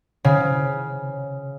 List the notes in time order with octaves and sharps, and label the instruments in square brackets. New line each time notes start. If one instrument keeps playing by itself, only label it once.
[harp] C#3